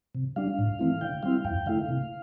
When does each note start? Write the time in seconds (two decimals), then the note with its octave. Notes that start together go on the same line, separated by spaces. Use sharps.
0.15 C3
0.36 G3 D4 F5
0.59 A2
0.79 E3 A3 C4 E4
1.01 D3 G5
1.23 G3 C4 E4 F5
1.45 F2 G5
1.66 D3 A3 E4 F5
1.89 C3